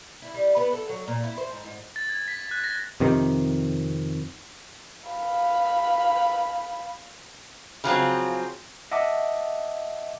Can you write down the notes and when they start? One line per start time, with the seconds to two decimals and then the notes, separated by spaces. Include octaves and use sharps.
0.22 E4
0.34 G3
0.57 B3
0.73 A4
0.89 F#3
1.08 A#2
1.24 E4
1.38 C5
1.52 G#2
1.64 G#2
1.96 A6
2.09 G#6
2.28 B6
2.51 F#6
2.64 A#6
3.00 F2 C3 D#3
5.10 F5 B5
7.84 C#3 F3 F#3 C4
8.92 D#5 E5 F#5 A5 D6 D#6